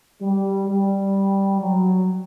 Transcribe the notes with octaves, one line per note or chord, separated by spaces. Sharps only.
G3
G3
F#3